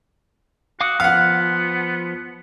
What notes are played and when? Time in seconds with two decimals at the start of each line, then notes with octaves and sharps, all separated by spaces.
0.81 F#4 F5 D6 D#6
1.00 F3 B3 F5 F#5